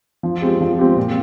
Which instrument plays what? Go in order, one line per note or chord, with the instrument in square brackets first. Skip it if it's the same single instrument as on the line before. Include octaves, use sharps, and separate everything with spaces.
[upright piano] F3
G#3 C4 G4
F3
G#3 C4 G4
A#2